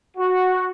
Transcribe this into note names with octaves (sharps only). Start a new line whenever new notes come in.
F#4